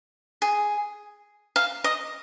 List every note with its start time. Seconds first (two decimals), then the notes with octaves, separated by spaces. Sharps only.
0.42 G#4
1.56 F5
1.84 D#5